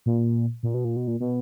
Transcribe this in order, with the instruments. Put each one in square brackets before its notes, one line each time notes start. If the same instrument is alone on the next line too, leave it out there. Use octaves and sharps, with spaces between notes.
[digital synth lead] A#2
A#2
B2
A#2
B2
A#2
B2